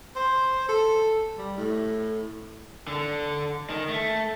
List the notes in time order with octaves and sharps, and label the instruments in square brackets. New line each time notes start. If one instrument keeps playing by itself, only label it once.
[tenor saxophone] C5
A4
G3
A2
[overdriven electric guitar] D3
D#3
A3